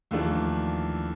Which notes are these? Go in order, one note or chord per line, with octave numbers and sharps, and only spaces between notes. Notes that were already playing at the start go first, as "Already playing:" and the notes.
D#2 E3 F3 A3 D4